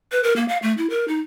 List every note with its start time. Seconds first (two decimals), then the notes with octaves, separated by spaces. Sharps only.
0.12 B4
0.24 A#4
0.36 A#3
0.48 F5
0.62 A3
0.78 E4
0.90 A#4
1.08 D#4